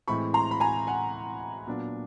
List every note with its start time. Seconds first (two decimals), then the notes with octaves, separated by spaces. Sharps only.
0.08 A2 E3 G#3 C4 B5 C#6
0.34 A#5 C6
0.51 B5
0.60 G#5 A#5
0.87 F#5 G#5
1.67 A#2 F#3 B3 D4